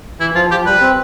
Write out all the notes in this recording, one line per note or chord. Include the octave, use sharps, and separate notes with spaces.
E3 E4
F3 F4
F3 G4
G3 B4
C4